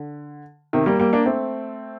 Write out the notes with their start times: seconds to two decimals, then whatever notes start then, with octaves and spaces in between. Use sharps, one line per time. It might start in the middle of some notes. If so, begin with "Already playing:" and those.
Already playing: D3
0.73 C3 D#3
0.86 G3 A#3
0.99 G3 A#3
1.13 A#3 D4
1.26 A3 C4